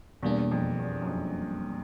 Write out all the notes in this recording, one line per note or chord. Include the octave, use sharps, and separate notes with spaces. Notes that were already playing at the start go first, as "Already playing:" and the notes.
E2 B2 G3 A#3 D4
F2
E2
F#2
F2